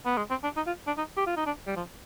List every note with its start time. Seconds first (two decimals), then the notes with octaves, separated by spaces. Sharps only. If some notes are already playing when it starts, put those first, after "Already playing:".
0.06 B3
0.17 G#3
0.30 C4
0.44 D4
0.56 D#4
0.67 F4
0.87 D4
0.98 D#4
1.17 G4
1.27 F4
1.37 D#4
1.46 D4
1.67 G3
1.76 F3